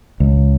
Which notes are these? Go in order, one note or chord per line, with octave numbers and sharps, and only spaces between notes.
C#2